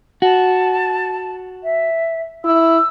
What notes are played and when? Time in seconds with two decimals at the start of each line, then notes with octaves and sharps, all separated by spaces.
0.22 F#4 A5
1.63 E5
2.44 E4 E6